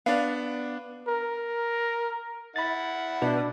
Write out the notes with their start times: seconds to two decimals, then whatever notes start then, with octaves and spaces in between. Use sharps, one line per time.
0.06 B3 D4 D5 F5
1.08 A#4
2.56 E4 F#5 B5 A6
3.22 B2 D4